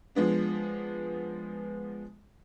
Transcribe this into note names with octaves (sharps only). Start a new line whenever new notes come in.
F3 G#3 B3 D4